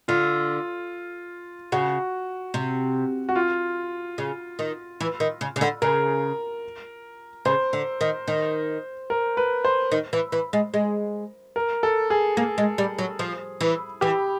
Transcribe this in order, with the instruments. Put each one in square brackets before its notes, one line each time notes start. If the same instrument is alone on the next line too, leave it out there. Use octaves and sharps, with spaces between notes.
[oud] D3 [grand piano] F4
[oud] C#3 [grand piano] F#4
[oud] C3
[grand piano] F#4
F4
[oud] C#3
D#3
E3
D#3
C#3
C#3
D3
[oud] C#3 [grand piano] A#4
[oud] C#3 [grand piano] C5
[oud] D3
D#3
D#3
[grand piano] A#4
B4
C5
[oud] D#3
E3
E3
G#3
G#3
[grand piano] A#4
A4
G#4
[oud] A#3 [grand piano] G#4
[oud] G#3
G3
F#3
F3
E3
[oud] E3 [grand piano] G4